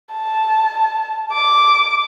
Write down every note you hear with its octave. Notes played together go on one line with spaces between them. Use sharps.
A5
D6